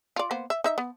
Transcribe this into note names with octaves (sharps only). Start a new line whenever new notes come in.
F4 D5
A#3 B3 C5
E5
D#4 E5
B3